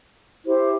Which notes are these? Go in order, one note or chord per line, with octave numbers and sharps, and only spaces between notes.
E4 G4 C5